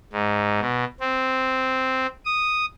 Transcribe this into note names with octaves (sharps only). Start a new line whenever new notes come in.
G#2
B2
C4
D#6